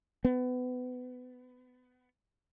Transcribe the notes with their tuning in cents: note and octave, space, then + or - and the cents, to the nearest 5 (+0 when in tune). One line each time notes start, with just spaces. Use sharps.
B3 +25